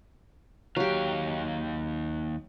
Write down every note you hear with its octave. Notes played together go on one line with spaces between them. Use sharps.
D#2 F#3 G4 F5